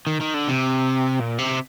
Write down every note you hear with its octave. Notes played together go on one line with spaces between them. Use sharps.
D#3
D#3
D3
C3
A#2
C3